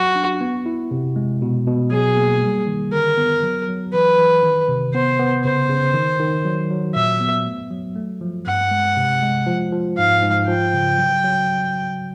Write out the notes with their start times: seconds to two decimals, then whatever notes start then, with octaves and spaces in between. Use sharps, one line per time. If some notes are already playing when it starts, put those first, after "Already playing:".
Already playing: F#3 F#4
0.16 D4
0.41 B3
0.66 E4
0.91 C3
1.16 G#3
1.42 B2
1.67 B2
1.91 F#3 G#4
2.17 A#3
2.42 G3
2.67 D#3
2.93 D3 A#4
3.17 B3
3.43 F#3
3.68 F#3
3.93 E3 B4
4.18 E3
4.43 D#3
4.68 C3
4.94 B3 C5
5.19 B3
5.44 C#3 C5
5.69 C#3
5.94 D#3
6.20 D#3
6.45 F#3
6.70 F#3
6.95 A#2 E5
7.20 B3
7.46 A3
7.70 F#3
7.96 A3
8.21 F3
8.47 G2 F#5
8.71 G#3
8.97 C3
9.23 G#3
9.47 F3
9.72 F3
9.98 G#2 F5
10.22 G#2
10.48 F3 G5
10.74 C#3
10.98 F#3
11.24 F#3